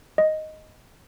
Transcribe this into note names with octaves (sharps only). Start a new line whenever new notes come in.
D#5